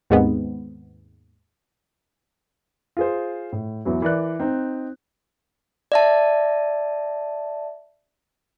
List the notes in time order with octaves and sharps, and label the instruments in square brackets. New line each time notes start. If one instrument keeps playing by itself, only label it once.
[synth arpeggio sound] D#2 G#2 G#3 B3 C4
[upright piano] F4 G#4 C5
A2
E2 E3 F#3
E3 A#4 D5 F#6
C4 D#4
[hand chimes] D5 E5 A5